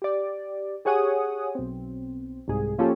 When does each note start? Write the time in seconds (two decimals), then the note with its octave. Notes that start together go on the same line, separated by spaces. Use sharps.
0.02 G4 D5
0.85 G4 G#4 C#5 F#5 G#5 D#6
1.55 B1 C4
2.48 C2 G#2 G#4
2.78 F3 A#3 C#4 F4 G4 A4